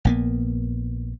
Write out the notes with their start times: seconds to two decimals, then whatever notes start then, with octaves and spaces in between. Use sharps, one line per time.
0.05 A#1 A#3 B3